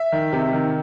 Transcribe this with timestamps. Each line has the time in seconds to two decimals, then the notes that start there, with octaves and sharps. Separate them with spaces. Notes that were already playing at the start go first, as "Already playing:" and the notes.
Already playing: E5
0.12 D#3
0.33 C3
0.53 D#3